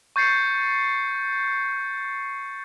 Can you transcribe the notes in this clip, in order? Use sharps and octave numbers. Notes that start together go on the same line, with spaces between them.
C#6 G6 A6 C7 C#7